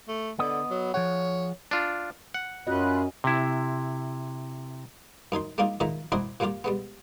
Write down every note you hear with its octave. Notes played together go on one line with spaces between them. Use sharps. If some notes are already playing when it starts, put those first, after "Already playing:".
A3
D3 B3 D#5
F#3
F3 G#4 C#5 F#5
D4 F4
F#5
F#2 C#4 F4 F#4 D#5 B5 F#6
C3 E4
F#2 D#4 G#5 C6
G#3 A#3 D4 D#4 F4
A#2 D#3 G#3 E5 A#5
D4 E4 F#4 A#4 C5 D#5
A#2 G3 A#3 F4 G4
G3 G#3 B3